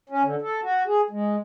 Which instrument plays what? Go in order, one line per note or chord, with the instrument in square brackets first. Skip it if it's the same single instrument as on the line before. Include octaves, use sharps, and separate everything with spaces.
[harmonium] C#4
D3
A4
F#4
G#4
G#3